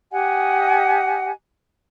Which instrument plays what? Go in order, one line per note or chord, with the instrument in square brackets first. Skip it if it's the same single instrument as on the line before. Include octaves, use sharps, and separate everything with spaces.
[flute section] G4 D#5 F#5 G#5